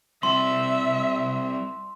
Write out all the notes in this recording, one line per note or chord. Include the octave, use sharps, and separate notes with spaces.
G3 C4 E4 E5 C6